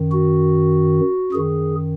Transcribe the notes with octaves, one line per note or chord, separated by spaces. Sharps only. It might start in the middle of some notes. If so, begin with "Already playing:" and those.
Already playing: F#2 D#3
F#4
F#2 D#3 G#4